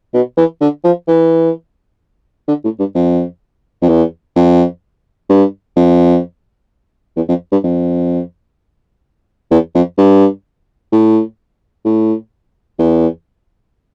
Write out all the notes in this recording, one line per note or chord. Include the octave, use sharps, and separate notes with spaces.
B2
E3
D3
F3
E3
D3
A2
G2
F2
F2
E2
F2
G2
F2
E2
F2
G2
F2
E2
F2
G2
A2
A2
E2